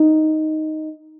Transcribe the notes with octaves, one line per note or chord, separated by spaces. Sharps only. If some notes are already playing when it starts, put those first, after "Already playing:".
Already playing: D#4